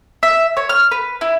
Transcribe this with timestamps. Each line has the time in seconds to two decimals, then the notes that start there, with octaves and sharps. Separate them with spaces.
0.23 E5
0.57 C#5
0.69 F6
0.91 B4
1.21 E4